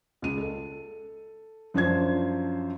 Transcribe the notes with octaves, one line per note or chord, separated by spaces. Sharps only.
C#2 D#7
A4
F#2 F3 D4 C5 G#6